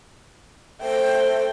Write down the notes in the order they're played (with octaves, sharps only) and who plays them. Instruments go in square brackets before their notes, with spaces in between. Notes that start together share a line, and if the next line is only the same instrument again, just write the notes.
[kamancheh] A3 G5 [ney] C5